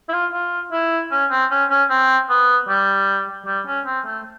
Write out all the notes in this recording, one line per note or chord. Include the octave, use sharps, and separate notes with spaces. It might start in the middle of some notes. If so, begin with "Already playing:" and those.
E4
F4
F4
E4
C#4
C4
C#4
C#4
C4
B3
G3
G3
C#4
C4
A3